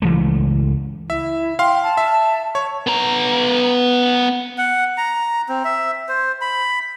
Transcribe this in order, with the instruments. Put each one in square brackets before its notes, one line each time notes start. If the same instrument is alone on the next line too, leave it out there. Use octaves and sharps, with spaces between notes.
[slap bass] C#2 E3 G#3 A3
[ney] E4 [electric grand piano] E5
[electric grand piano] F5 C6 [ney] G5
[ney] A5
[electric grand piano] E5
[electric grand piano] C#5 [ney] C#6
[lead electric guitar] B3 A#5
[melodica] F#5
A#5
C4
E5
C5
B5